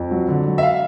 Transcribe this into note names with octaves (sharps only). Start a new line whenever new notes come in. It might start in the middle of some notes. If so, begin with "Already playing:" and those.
Already playing: F2
F#3
D3
F#3
E5
F5